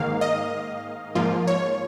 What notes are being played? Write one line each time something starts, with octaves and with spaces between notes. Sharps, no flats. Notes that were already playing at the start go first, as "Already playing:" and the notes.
Already playing: G#2 D#3 A#3 F5
D#5
G#2 F3 A#3 F4
C#5